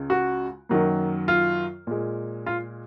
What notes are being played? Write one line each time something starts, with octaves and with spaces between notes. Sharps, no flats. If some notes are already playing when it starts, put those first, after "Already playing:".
Already playing: C#2 C#3 G#3
F#4
F#2 D#3 F#3 A#3
F4
A#2 G#3
F4